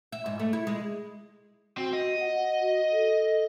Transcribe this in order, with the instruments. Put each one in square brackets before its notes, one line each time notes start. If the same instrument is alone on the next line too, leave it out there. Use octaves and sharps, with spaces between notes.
[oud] E5
G#2
A3
E4
G#3
[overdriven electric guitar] C4 [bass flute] F#4
[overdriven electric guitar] D#5
[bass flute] F#5
F#4
A4